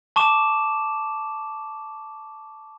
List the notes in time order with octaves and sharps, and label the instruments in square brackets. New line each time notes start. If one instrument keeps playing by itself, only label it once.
[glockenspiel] A5 C#6 D6 E7